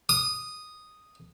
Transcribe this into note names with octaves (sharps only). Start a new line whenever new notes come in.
D#6